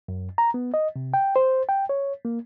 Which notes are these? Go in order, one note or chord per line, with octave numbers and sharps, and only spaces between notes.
F#2
A#5
B3
D#5
C3
G5
C5
G5
C#5
A#3